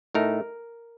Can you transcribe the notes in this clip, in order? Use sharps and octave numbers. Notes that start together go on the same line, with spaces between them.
A2 A3 D#4 A#4